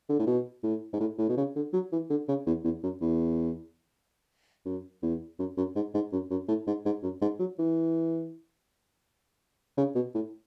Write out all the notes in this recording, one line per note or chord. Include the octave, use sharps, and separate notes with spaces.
D3
A2
B2
A2
G#2
A2
A2
B2
C#3
D3
F#3
E3
D3
C#3
E2
E2
F#2
E2
F#2
E2
F#2
F#2
G#2
G#2
F#2
F#2
A2
G#2
G#2
F#2
G#2
F#3
E3
C#3
B2
A2